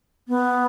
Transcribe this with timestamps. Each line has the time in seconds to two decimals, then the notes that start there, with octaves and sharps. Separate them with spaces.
0.28 B3